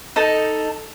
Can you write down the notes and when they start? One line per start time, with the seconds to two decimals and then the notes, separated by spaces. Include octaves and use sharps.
0.16 D#4 A4 A5